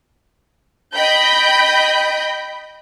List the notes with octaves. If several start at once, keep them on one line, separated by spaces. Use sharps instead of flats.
D#5 G5 B5 G6